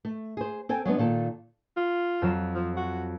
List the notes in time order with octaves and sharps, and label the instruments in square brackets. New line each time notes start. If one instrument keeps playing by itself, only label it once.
[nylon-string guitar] A3
G#4 C5
C4 A4 G5 G#5
F#3 G#3 B3 D4
A#2 D#3 A4
[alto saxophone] F4
[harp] F2 F#3 E7
[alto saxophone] F3
F#4